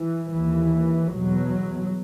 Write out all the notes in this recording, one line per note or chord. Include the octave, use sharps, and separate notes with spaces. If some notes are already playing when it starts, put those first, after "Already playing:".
Already playing: E3
D#2 E3
E2 B2 F#3